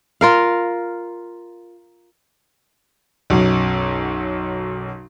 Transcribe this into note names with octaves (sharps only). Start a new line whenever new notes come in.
F4 A#4 F5
B1 F#2